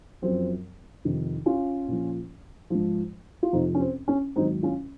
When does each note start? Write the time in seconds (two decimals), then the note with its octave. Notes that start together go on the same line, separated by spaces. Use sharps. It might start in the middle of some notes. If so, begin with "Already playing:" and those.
0.22 F#2 F3 C4
1.05 F2 C3 D#3
1.46 C#4 F4
1.88 A#2 F3
2.70 G#2 F3
3.43 F4
3.53 F2 C3 F3 C4 D#4
3.75 C#4
3.81 C4
4.08 C#4
4.36 G#2 D#3 F#3 C4 D#4
4.63 C#4 F4